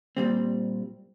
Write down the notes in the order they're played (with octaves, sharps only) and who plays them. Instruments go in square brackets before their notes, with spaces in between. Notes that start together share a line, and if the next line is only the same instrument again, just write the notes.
[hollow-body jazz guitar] A#2 G3 C4